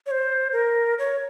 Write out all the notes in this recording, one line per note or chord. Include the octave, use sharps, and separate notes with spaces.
C#5
C5
A#4
C#5